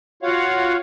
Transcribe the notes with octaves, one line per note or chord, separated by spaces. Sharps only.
F4 F#4 C#5 F5 F#5